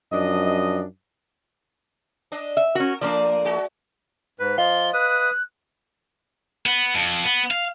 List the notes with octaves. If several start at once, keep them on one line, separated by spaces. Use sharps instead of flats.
F#2 F3 D4 D#5
D4 D#5
E5
C#4 F#4 A#4
F3 A3 A#3 D4 D5
G#3 F#4
G#2 B4
F3 F4 D#5 F5 G7
B4 D#6 F#6
B3
F2
B3
F5